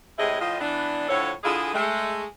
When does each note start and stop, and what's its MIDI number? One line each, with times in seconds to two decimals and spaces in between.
0.19 0.37 45
0.19 0.37 48
0.19 0.37 56
0.19 0.37 64
0.19 0.37 68
0.19 0.37 75
0.39 0.56 45
0.39 0.56 53
0.39 0.56 65
0.39 0.56 75
0.60 1.05 52
0.60 1.05 59
0.60 1.05 62
1.09 1.30 45
1.09 1.30 50
1.09 1.30 53
1.09 1.30 69
1.09 1.30 73
1.44 1.70 50
1.44 1.70 64
1.44 1.70 65
1.44 1.70 68
1.74 2.23 56
1.74 2.23 57